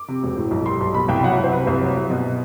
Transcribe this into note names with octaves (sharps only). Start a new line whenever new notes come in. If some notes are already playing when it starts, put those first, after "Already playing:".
Already playing: D6
C3
E1
A2
B1
G3 C6
B1
B2 B5
C2 G5
F#3 F#5
E5
C2
C5
C3 B4
C2 C5
F#3
C2
B2